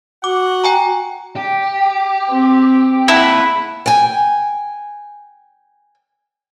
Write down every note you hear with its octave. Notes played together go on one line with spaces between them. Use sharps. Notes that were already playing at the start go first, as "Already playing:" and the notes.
F#4 F#5 D6
G5 G#5 A#5
G4
C4
A#3 E4 F#5 A5 B5
G5 G#5